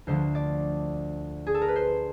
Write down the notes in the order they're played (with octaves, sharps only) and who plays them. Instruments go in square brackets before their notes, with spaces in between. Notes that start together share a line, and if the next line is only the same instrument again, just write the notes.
[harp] D2 D3 F3 C5
D5
G#4
A4
A#4
B4
C5